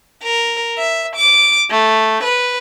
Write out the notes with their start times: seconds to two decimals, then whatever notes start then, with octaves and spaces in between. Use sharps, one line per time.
0.22 A#4
0.75 E5
1.14 D6
1.70 A3
2.23 B4